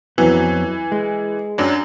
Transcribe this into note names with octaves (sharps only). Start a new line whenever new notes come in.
F2 E3 F#3 B3
G#3
F#2 F#3 D4